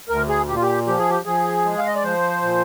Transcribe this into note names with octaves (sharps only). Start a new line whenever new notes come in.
D2 A#4
G#4
A#2 G4
F4
G4
F3 G4
G#4
G4
F3 G#4
G#3
F5
D#5
D5
F3 C5
A#2